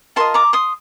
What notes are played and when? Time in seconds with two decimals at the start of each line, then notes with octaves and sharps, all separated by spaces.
0.16 F4 A#4 D#5 A5 C6
0.34 A#5 D6
0.53 C6 D#6